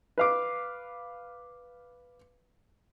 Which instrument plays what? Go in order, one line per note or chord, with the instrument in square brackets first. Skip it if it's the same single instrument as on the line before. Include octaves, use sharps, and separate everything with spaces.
[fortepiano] B4 F5 D6